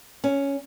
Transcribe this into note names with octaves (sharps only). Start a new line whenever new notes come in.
C#4